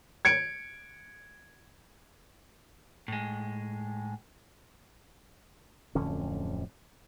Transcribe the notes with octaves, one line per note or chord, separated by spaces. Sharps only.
G#6 C#7 D7
A2 G#3
D1 F2 D3 C#4